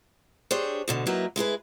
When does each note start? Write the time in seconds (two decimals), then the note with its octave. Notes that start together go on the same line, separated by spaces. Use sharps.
0.51 D4 G4 G#4 C5 C#5
0.88 D2 B2 D3
1.07 F#3 A#3 D#4 E4 B4
1.36 G#3 E4 G#4 B4